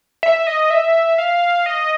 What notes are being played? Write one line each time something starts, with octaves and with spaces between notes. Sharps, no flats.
E5
D#5
E5
F5
D#5